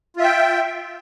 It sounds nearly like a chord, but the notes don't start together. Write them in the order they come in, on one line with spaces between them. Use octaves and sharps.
F4 E5 G5